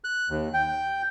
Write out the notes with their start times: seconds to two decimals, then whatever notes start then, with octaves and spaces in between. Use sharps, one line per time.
0.04 F#6
0.30 D#2
0.54 G5